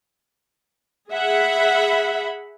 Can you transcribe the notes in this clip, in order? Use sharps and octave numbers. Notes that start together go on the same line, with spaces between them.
G#4 E5 F#5 B5